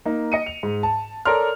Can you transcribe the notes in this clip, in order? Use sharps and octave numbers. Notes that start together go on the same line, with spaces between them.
A#3 D#4
D#5 C#7 D#7
F7
G#2
A5
A4 A#4 C#5 D5 C6 F6